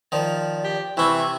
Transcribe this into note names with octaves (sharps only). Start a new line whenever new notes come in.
D#3 F3 D5
G4
C3 E3 E4 C#6
C#6